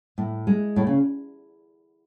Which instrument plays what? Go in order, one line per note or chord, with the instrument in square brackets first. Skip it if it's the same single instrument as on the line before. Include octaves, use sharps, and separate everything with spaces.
[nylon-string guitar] A2
G#3
A2
C#3